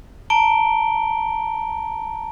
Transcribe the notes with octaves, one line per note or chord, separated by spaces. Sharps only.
A5 A#5 D7 G7